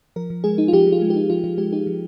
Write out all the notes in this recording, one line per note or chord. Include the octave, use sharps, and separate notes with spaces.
F3 A#4
F3
G#3 G#4
D#4
F4
F3 G4
F3
F4
G#3
G4
D#4
F3 F4
F3 F4
G#3 G4
D#4 G4
F3